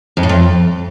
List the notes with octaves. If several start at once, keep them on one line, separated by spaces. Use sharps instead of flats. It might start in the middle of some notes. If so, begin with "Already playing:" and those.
F2
A2
F2